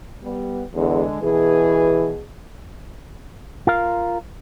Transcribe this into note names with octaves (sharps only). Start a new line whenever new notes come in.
G3 B3
E2 D3 G#3
B2 E3 G#4
F4 A#4 F5